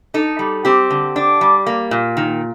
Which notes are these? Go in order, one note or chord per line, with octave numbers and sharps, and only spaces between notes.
D#4 A4
G3
C4 G4
D3
D4
G3
A#3
A#2
D#3